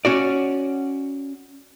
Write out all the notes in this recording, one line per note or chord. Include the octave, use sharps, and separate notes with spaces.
C#4 F#4 D5